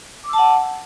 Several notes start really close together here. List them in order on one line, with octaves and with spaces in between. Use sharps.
D6 E6 A5 F#5